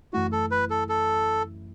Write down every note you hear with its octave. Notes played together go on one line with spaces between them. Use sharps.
F#2 E3 A3 E4 F#4
A4
B4
A4
A4